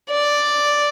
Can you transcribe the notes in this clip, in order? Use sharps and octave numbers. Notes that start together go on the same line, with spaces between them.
D5